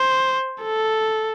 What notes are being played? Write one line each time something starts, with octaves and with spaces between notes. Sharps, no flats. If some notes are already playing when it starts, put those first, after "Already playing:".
Already playing: C5
A4